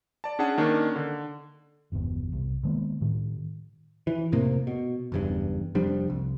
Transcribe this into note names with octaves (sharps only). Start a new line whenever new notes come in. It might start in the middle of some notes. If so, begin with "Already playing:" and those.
D5 A5
C#4 D4 G#4 F#5 A5
D#3 A#3 C#4 D4
D3
G1 E2 B2
C2
D#3 G#3 A#3 B3
A2 D#3
E3
F1 A2 C3 A#3
B2
F#1 E2 G2
F1 F3 G3 D4
C2